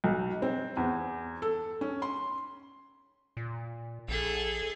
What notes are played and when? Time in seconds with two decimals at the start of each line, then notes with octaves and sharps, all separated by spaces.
0.04 B1
0.42 C4
0.77 E2
1.42 A4
1.81 C#4
2.02 C6
3.37 A#2
4.08 A#1 G#4 A4